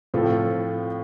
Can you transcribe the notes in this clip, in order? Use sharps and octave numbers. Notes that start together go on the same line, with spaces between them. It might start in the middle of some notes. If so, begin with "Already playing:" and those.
A2 F3 C4 F4 A4